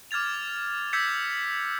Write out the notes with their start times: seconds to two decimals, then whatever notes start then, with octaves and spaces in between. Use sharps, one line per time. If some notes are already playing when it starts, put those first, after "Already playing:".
0.11 D6 F6 G#6 A6 F7
0.93 D6 E6 G6 G#6 B6 C#7